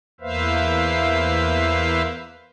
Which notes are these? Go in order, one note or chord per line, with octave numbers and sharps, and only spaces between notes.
E2 A#3 B4 C5 E5 F5